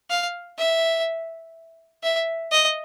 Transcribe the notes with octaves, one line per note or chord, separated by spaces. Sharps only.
F5
E5
E5
D#5